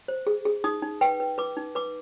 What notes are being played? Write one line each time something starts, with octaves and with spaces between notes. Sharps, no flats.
C5
G#4
G#4
D#4 D#6
D#4
B4 G5
B4
B4 D6
D#4
B4 D6